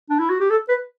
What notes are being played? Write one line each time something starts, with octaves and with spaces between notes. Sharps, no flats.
D4
E4
F#4
G4
A4
B4